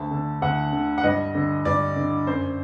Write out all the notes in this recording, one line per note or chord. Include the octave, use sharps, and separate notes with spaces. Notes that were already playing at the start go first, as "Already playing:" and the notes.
Already playing: D2 A5
D3
D2 F#5
D3
F#5
G2 D#5
D3
G2 D5
D3
F#2 C5